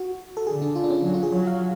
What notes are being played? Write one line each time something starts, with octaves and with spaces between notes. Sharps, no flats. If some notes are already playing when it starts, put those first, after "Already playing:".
Already playing: F#4
A4
D3 G#4
D4
F4
D4
C#4
F#3 D4
F4
G#4
F#3 C#5
F5